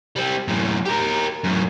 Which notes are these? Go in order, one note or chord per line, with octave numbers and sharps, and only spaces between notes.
G3 C4
F#2 A2
G4 A#4
F#2 A2